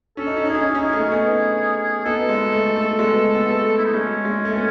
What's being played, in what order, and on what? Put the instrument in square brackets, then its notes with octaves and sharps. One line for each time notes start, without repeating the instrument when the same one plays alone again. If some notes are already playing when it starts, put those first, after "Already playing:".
[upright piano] C#4 [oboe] A4
[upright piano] D#4
C#4
[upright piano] D#4 [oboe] G#4
[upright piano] C#4
D#4
C#4
[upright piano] D#4 [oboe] G#4
[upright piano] A3 C#4
B3 D#4
[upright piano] B3 D#4 [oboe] A4
[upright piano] G#3
A3
A3
G#3 B3
B3
A3
[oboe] E4
D#4
[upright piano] G#3 [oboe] C#4
[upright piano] G#3
A3
B3